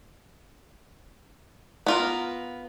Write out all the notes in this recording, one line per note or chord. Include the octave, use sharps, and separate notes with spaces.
B3 F4 A#4